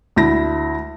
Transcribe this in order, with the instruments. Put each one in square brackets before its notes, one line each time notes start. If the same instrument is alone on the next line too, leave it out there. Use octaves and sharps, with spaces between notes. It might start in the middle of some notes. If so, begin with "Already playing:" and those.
[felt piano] D2 E4 A#6